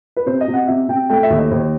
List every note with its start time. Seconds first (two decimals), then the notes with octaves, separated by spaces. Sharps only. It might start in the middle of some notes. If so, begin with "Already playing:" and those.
0.16 B4
0.26 C3 C5
0.41 D#5
0.48 C3
0.54 F#5
0.67 C3 E5
0.88 C3 G5
1.10 A3 G5
1.23 E5
1.30 D#2
1.38 D#5
1.50 D#2 C5